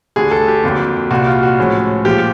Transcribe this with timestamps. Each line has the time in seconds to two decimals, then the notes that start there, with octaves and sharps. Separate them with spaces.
0.16 D2 D3 G3 G#4
0.31 A4
0.48 G4
0.63 F2 D3 F#3 A#3
1.11 C2 A#2 G3 F#4
1.27 F4
1.43 F#4
1.58 A2 F3 G#3 C#4
2.05 A#2 F3 G#3 G4